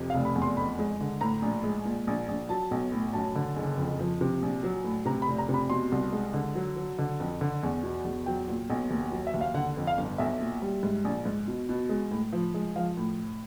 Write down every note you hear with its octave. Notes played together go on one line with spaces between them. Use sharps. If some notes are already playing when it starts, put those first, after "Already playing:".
Already playing: F2 C3
F5
F1
B5
E2
C6
F2 B5
G#3
D3
A2 A#5
A#1
G#3
A#2
A#1
A#1
F#3 A5
B1
A2
F#2 A5
D3
F#1
F2
F3
C3
A#1
F#3
A2
C3 A#5
B5
F1
A#5
C3
B5
B2 C6
C2
G#3
D3
F#3
F#3
D3
F2
D3
E2
B2
E2
F#3 G5
A#2
B1
D#2
F#3
E5
D#2
F5
D3 F#5
F2
F5
G1
B1 E5
A#2
G3
G#2
A#1
G#2
B2
B2
G#3
A2
F3
G#3
F3 F5
A2